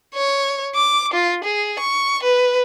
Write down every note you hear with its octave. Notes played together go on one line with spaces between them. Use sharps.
C#5
D6
F4
G#4
C#6
B4